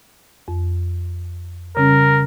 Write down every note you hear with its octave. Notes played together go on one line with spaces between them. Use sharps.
F2
C#3 G3 C#4 A#4